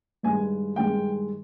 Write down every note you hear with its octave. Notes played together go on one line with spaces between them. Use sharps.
G2 D#3 G#3 G#5
G2 D#3 G#3 G5